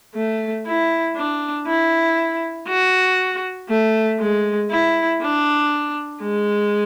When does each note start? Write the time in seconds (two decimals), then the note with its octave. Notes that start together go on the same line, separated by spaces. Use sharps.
0.15 A3
0.66 E4
1.16 D4
1.67 E4
2.68 F#4
3.69 A3
4.19 G#3
4.70 E4
5.21 D4
6.22 G#3